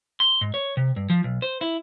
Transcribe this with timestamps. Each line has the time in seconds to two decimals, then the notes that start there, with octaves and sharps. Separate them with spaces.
0.20 C6
0.41 G#2
0.54 C#5
0.77 C3
0.96 G2
1.10 F3
1.24 B1
1.42 C5
1.61 E4